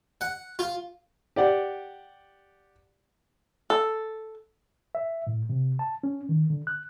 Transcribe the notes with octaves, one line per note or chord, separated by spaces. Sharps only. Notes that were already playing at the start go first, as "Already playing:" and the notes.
F#5
F4
G4 D5 F#5
A4
E5
A2
C3
A5
C#4
D#3
D3
F#6